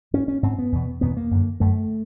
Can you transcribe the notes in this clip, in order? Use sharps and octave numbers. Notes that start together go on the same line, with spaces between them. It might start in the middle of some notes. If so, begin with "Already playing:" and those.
G#2 C#4
C#4
G#2 C4
B3
E2 B2
E2 B2 B3
A#3
F#2 D3
F#2 D3 A3